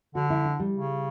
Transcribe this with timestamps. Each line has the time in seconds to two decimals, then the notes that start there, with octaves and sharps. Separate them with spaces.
0.15 D3 F#4
0.30 E4
0.45 D4
0.60 G3
0.74 C#3